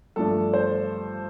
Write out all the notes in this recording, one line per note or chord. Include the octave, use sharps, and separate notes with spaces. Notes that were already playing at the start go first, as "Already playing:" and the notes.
G2 F3 A3 D4 A4
C5